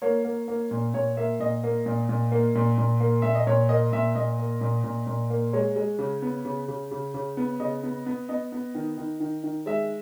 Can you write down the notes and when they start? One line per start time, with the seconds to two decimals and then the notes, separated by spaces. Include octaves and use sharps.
0.02 A#3 C#5
0.25 A#3
0.48 A#3
0.71 A#2
0.94 A#2 C#5
1.17 A#3 E5
1.40 A#2 D#5
1.63 A#3
1.86 A#2
2.09 A#2
2.32 A#3
2.55 A#2
2.78 A#2
3.00 A#3
3.22 A#2 E5
3.35 D#5
3.47 A#2 C#5
3.69 A#3 D#5
3.93 A#2 E5
4.15 A#2 D#5
4.39 A#3
4.61 A#2
4.84 A#2
5.07 A#2
5.30 A#3
5.53 G#3 C#5
5.76 G#3
5.99 C#3
6.22 B3
6.45 C#3
6.68 C#3
6.91 C#3
7.14 C#3
7.37 B3
7.60 C#3 D#5
7.83 B3
8.06 B3
8.29 B3 D#5
8.52 B3
8.75 D#3
8.98 D#3
9.20 D#3
9.44 D#3
9.66 G#3 E5